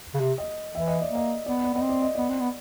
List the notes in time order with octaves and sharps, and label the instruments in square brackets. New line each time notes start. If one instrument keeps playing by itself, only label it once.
[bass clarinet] C#3
C3
[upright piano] D#5
[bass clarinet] E3 [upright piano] E5
[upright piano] D#5
D5
[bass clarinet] A#3
[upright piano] D#5
[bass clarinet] B3 [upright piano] D5
[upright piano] D5
[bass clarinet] B3 [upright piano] D#5
[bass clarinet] C4
[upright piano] D5
D#5
[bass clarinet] B3 [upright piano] D5
[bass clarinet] C4
B3